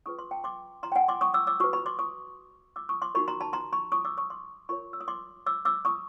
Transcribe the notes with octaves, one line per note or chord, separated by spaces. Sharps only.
C#4 F4 G#4 B4 C#6 D#6
C6 D6
G5 A5
C6 D6
A#5 C6
G5
F#5 G#5
C6 D6
C#6 D#6
D6 E6
D6 E6
F#4 B4 C#6 D#6
B5 C#6
C6 D6
C#6 D#6
D6 E6
C#6 D#6
C6 D6
D#4 F#4 A#4 B5 C#6
A#5 C6
A5 B5
A#5 C6
B5 C#6
C#6 D#6
D6 E6
C#6 D#6
C6 D6
F4 A#4 C#5 B5 C#6
E6
D#6
C6 D6
D6 E6
D6 E6
C#6 D#6